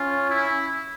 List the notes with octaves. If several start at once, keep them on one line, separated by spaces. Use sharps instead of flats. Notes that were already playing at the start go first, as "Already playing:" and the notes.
Already playing: C#4 F4
E4